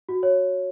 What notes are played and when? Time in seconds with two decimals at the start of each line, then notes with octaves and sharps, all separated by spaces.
0.09 F#4
0.23 C#5